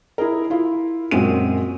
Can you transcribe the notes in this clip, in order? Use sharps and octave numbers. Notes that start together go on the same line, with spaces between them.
E4 G#4 A#4
E4 F4
F#2 A#2 G#3 C4 F#4 D#7